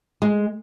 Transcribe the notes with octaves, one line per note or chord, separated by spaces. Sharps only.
G#3